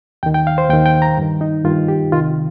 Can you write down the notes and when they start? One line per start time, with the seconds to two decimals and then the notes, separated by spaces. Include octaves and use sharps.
0.23 D#2 D#3 G5
0.34 G5
0.47 F5
0.58 C5
0.70 D#2 G5
0.73 D#3
0.86 G5
1.02 A#5
1.17 G2 D#3
1.41 D#4
1.65 G2 D#3 F4
1.88 G4
2.12 C2 C3 D#3 F4